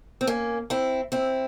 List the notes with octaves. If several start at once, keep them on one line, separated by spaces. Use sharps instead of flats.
C4
A#3 C#4
C4 E4
C4 E4